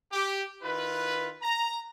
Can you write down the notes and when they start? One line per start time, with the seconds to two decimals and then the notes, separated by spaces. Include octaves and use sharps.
0.12 G4
0.63 D#3 E4 F4 B4
1.42 A#5